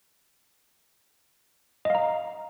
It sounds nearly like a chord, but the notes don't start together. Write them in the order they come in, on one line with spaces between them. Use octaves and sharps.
D#5 F5 A#5